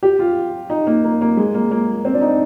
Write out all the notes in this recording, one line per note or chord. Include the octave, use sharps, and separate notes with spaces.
G4
F4
D#4
A#3
A#3
A#3
G#3
A#3
A#3
C4
D4
D#4